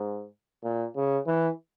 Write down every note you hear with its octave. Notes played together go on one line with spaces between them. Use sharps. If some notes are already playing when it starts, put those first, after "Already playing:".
Already playing: G#2
A#2
C#3
E3